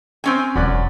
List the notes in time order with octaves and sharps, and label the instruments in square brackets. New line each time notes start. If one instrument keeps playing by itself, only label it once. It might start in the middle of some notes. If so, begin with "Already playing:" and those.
[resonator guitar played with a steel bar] C4 C#4 G#5
[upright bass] E1 E3 [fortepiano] F#2 D5 F#6